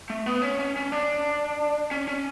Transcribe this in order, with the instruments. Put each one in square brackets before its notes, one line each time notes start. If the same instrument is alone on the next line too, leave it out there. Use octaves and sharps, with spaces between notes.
[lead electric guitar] A3
B3
C#4
C#4
C#4
D4
C#4
C#4